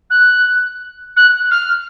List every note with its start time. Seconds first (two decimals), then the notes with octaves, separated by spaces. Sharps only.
0.10 F#6
1.16 F#6
1.51 F6